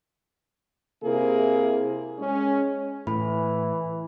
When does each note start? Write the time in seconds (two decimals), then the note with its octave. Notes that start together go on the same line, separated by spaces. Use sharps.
1.03 C3 A#3 E4 G#4
2.19 G#3 C#4
3.07 A2 E3 B5